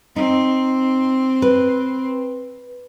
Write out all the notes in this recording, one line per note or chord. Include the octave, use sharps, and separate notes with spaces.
C4 D#4
B4